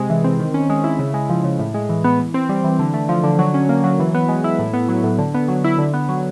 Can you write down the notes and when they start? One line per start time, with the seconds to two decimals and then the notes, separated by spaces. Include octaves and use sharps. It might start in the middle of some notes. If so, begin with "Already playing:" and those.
Already playing: C3 G#3
0.10 E3
0.24 C4
0.39 D#3
0.54 C#4
0.70 G#3
0.84 E4
0.99 C#3
1.14 G#3
1.30 F3
1.44 C#3
1.59 A2
1.74 G#3
1.89 E3
2.04 B3
2.19 E3
2.34 C4
2.49 G3
2.64 E3
2.79 D3
2.94 A3
3.09 F3
3.24 D3
3.39 F#3
3.54 C#4
3.69 A#3
3.84 F#3
4.00 E3
4.15 B3
4.29 G#3
4.44 E4
4.59 A2
4.73 B3
4.89 F#3
5.04 A2
5.19 D3
5.35 B3
5.48 F#3
5.64 E4
5.78 D3
5.94 B3
6.09 F#3